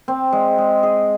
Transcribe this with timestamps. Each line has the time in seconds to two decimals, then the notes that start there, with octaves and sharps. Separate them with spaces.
0.08 C4
0.33 G#3
0.58 G#3
0.83 G#4